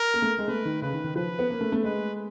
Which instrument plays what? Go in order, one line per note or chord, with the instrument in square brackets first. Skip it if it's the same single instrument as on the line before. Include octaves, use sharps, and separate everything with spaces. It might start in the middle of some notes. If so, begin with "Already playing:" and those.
Already playing: [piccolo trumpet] A#4
[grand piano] A#3
A3
G#3
[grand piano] A3 [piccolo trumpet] B4
[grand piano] D#3
[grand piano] C#3 [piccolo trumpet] B4
[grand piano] D#3
D#3
[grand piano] F3 [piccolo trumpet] B4
[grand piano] B3
A#3
A3
A3
[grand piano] G#3 [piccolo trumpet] B4